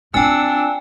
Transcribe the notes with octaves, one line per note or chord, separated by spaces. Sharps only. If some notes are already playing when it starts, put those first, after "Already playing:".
C4 D4 F4 G5 G#5 E6